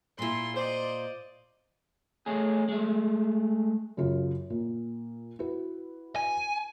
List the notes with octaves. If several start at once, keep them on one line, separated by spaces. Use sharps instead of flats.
A#2 E4 F4 C6
C5 D5 D#5
A3 C#4 G#4
G#3 A3
F#2 C#3 F4
A#2
E4 F#4 B4
G#5